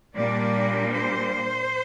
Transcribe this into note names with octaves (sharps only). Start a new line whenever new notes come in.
A#2 G3 A#3 D4 D5
C5